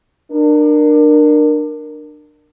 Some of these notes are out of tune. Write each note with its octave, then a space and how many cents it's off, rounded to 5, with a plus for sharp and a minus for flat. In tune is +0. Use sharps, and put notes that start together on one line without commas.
D4 +25 A#4 +0